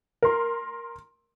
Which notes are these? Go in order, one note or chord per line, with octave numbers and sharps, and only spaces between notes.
A#4 C6